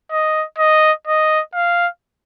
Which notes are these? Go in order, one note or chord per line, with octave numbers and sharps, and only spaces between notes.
D#5
D#5
D#5
F5